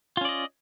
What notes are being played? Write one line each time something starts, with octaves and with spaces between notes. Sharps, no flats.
C#4 F4 D5 D#5